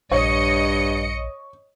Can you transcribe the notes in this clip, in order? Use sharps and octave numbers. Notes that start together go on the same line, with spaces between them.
A#1 G2 C#5 D#5 C#7